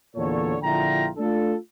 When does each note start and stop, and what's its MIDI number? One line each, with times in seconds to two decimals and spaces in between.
0.16 0.56 40
0.16 0.56 46
0.16 0.56 50
0.16 0.56 69
0.16 0.56 73
0.63 1.09 34
0.63 1.09 50
0.63 1.09 64
0.63 1.09 65
0.63 1.09 79
0.63 1.09 82
1.18 1.55 57
1.18 1.55 62
1.18 1.55 65
1.18 1.55 69